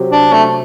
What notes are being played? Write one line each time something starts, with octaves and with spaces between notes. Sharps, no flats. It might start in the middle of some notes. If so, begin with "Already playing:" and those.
Already playing: C3 F#3 C4 G4
D4
A3